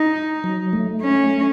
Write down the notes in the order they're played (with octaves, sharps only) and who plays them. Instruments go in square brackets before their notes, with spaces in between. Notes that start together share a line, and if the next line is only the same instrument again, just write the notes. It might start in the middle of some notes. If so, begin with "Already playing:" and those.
Already playing: [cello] D#4
[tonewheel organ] F#3
A3
[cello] C#4